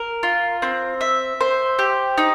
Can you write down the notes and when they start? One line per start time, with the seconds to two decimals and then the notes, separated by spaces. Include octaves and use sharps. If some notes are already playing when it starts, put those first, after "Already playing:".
Already playing: A#4
0.23 F4
0.62 C4
1.01 E5
1.41 C5
1.79 G4
2.18 D#4